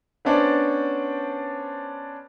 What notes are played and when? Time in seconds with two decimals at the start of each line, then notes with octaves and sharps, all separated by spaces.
0.25 B3 C#4 D4 C5 D5